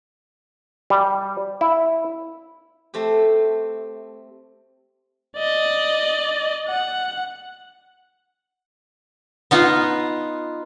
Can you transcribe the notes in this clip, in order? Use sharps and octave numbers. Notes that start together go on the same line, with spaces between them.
G3
E4
A3 C4 G4
D5 D#5
F#5
B3 D#4 F4